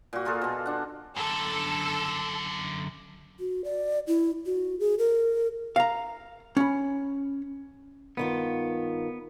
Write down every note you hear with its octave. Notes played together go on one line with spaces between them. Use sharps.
A#2 F#4
A#3 F4 G#4 A4
B2 A5
D4 F#5
F#2 D3 A4
F#4
D5
E4
F#4
G#4
A#4
F5 A#5
C#4 B5
G2 D#3 B3 F4